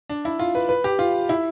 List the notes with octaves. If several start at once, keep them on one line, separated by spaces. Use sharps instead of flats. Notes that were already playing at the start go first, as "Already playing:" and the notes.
D4
E4
F4
B4
B4
G4
F4
E4